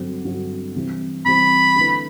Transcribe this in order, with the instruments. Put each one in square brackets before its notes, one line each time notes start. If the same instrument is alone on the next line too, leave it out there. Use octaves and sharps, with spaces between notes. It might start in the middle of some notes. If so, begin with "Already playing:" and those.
Already playing: [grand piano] G2 D3 F#3 C4 F#4
G2 D3 F#3 C4 F#4
C3 E3 G3 C4
[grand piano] C3 E3 G3 C4 [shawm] B5
[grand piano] D3 A3 E4 B4